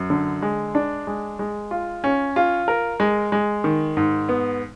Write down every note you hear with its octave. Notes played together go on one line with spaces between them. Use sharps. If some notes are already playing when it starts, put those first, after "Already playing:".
Already playing: F#2
D3
G#3
D4
G#3
G#3
F4
C#4
F4
A#4
G#3
G#3
D#3
G#2
B3